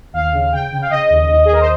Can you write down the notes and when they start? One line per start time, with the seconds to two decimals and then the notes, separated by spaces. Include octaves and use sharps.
0.13 D#2 F5
0.33 C#3
0.52 C#3 G5
0.72 C#3
0.82 F5
0.90 C#3 D#5
1.10 D#2
1.30 D#2
1.45 G#4
1.49 D#2 A#4
1.60 C5